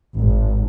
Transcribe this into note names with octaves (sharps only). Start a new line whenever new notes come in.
G#1